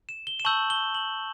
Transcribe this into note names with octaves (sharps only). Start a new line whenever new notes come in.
E7
G7
E7
A5 C#6 E6 G6 F#7
G7
F#7